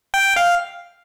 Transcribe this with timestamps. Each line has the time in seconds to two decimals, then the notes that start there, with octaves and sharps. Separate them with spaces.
0.14 G5
0.36 F5